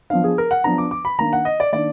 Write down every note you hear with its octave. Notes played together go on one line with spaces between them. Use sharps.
F3 B3 D4 F5
G#4
A#4
F#5
F3 B3 D4 A#5
D6
D6
B5
D#3 A#3 D4 A#5
F#5
D#5
D5
D#3 A#3 D4 D5